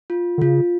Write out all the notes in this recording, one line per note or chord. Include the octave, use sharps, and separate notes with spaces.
F4
D3
C#3 F4